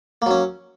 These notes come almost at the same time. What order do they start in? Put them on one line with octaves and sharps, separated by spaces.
A#3 F#3 C#4